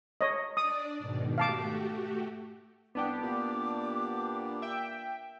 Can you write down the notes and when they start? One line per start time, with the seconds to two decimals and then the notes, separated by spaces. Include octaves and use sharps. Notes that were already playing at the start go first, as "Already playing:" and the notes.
0.21 C#5 D#5
0.57 D4 D5 D#6
0.99 G#2 B2 D#3
1.38 A3 F#4 G4 F5 A5 D6
2.95 C2 B3 D4 G4 D6
3.23 A#2
4.62 E5 G5